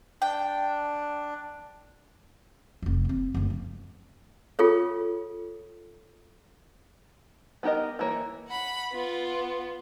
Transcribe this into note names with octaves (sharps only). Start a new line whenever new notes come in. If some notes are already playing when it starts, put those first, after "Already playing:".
D4 G5
F1 F2
A#3 C4
F#1 D2
F3
F4 G#4 A4 C#5
B3 D#4 G4 A#4 D#5
E3 A#3 C#5
F#5 B5
B3 F4